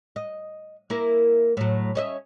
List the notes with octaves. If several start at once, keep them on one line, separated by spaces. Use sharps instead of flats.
D#5
A#3 E4 A#4
A2 F#3
C#4 D#5 E5